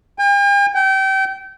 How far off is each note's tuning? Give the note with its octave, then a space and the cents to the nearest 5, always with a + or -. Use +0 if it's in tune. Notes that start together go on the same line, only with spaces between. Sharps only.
G5 +45
G5 -30